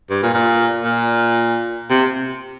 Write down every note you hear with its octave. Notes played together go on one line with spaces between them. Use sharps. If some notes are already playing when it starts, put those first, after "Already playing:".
G2
A#2
A#2
A#2
C3